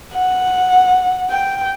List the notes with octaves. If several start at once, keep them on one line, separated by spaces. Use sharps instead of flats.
F#5
G5